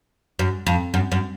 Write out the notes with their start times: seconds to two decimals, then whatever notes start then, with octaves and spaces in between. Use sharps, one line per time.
0.39 F#2
0.67 F2
0.94 F#2
1.12 F#2